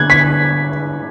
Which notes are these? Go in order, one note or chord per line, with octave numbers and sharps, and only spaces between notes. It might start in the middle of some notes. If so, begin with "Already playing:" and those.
Already playing: D3 A#3 D4 F#6 G#6
B6